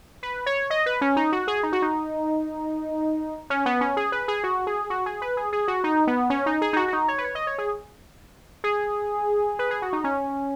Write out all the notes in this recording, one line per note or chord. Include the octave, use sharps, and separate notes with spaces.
B4
C#5
D#5
B4
C#4
D#4
F#4
G#4
D#4
F#4
D#4
C#4
B3
C#4
G#4
B4
G#4
F#4
G#4
F#4
G#4
B4
G#4
G#4
F#4
D#4
B3
C#4
D#4
G#4
D#4
F#4
F#4
D#4
C#5
B4
C#5
D#5
C#5
G#4
G#4
B4
G#4
F#4
D#4
C#4